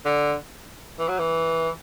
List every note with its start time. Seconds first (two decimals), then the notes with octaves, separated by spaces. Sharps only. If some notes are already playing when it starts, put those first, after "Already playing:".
0.05 D3
0.99 E3
1.09 F#3
1.19 E3